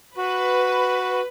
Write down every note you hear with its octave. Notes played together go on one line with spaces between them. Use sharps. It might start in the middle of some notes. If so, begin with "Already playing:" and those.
F#4 B4